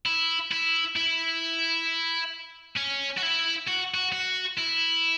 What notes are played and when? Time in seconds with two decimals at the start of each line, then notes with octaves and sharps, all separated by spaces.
0.06 E4
0.51 E4
0.96 E4
2.77 C#4
3.17 F#4
3.22 E4
3.68 F#4
3.95 F#4
4.13 F#4
4.58 E4